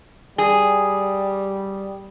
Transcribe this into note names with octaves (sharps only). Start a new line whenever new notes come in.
G3 G#4